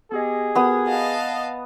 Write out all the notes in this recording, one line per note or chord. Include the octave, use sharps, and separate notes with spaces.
B3 G4 G#4 D#5
B3 F#4 G4 A#4 D#6
D#5 F5 F#5 A5